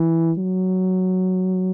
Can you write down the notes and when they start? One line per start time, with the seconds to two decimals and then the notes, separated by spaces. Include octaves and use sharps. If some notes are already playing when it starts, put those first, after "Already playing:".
Already playing: E3
0.38 F#3